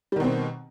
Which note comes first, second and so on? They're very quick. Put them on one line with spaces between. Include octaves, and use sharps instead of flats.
G3 D#3 B2 C4